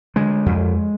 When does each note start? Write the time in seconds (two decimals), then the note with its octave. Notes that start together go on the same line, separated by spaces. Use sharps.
0.16 D3 G#3
0.46 F2